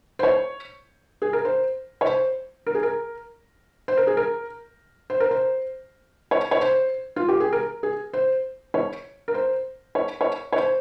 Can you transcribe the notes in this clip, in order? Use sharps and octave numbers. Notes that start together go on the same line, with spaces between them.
C5
C#5
G#4
A#4
C5
C#5
C5
A#4
G#4
A#4
C5
A#4
G#4
A#4
C5
A#4
C5
C#5
C#5
C5
F4
G4
G#4
A#4
G#4
C5
C#5
A#4
C5
C#5
C#5
C#5
C5